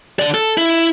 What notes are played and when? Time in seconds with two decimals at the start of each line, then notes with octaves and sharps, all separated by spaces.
0.19 D3 D5
0.34 A4
0.57 E4